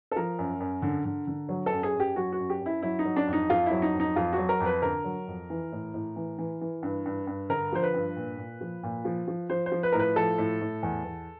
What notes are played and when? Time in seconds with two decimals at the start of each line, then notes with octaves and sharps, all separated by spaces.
0.11 A4
0.16 F3 A#4
0.39 F#2
0.60 F#2
0.82 D3
1.05 D3
1.27 D3
1.49 F#3
1.66 A4
1.72 F#2
1.83 G#4
1.94 F#2
2.00 G4
2.16 F#3 F#4
2.32 F#4
2.39 F#2
2.50 G4
2.60 F#2
2.66 E4
2.82 F#3 E4
2.99 D#4
3.05 F#3
3.16 D4
3.27 F2
3.33 D#4
3.50 F2 F4
3.66 E4
3.71 F#3
3.82 D#4
3.94 F2
4.00 D#4
4.16 F2 F4
4.33 F#4
4.38 F#3
4.49 A#4
4.60 F2
4.66 B4
4.82 D3 A#4
5.04 F#3
5.28 F2
5.50 E3
5.72 A2
5.94 A2
6.16 E3
6.38 E3
6.61 E3
6.83 G2
7.06 G2
7.27 G2
7.49 D3 A#4
7.72 F3 C5
7.83 B4
7.94 G2
8.16 A#2
8.38 A#2
8.61 F3
8.83 A#2
9.05 F3
9.28 F3
9.50 F3 C5
9.66 C5
9.72 F3
9.83 B4
9.92 A2 A#4
9.99 B4
10.16 F3 A4
10.38 A2
10.61 A2
10.83 E2
11.05 E2